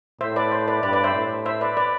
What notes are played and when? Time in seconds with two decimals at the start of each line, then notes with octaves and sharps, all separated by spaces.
0.21 A2 C5 E5
0.36 B4 D5
0.52 C5
0.68 B4 D5
0.83 G2 B4 D5
0.93 B4 D5
1.04 C5 E5
1.15 A2
1.46 C5 E5
1.61 B4 D5
1.77 B4 D5